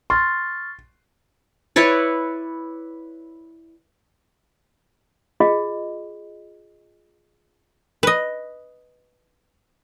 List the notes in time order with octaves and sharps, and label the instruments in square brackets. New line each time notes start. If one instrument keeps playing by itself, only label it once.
[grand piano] C6 [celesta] C#6 F6 A6
[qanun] E4 B4 C#5 D5
[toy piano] F4 G#4 D#5
[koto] B4 D#5